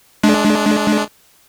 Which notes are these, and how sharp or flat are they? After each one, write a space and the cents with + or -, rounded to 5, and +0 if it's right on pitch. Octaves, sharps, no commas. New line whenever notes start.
G#3 +30 D4 +0